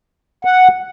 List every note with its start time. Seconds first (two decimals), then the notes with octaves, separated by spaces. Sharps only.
0.45 F#5